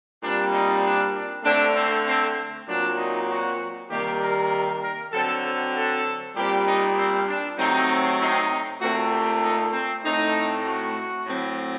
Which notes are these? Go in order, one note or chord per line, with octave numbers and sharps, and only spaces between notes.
A#2 G3 C4 D4
D#4
D4
D4
D3 A3 C4 D4
C4
C4
A#2 F#3 C4 D4
D#4
F#4
C3 D#3 G3 A#3 G4
A#4
A#4
D3 F#3 C4 A4
A4
A4
A#2 G3 C4 G4
D#4
C4
D4
C3 F#3 A3 C4 D#4
D#4
A#2 A3 C4 F#4
G4
D#4
C4
A2 A3 C4 D#4
F#4
A2 F#3 C4